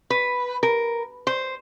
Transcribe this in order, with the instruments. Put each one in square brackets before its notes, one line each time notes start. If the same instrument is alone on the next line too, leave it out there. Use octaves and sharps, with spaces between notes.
[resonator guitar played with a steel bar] B4
A#4
C5